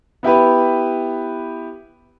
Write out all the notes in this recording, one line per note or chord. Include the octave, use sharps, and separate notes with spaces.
B3 E4 G4 B4